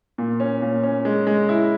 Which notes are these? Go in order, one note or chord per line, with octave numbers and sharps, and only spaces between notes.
A#2
C#4
A#2
C#4
G#3
G#3
E4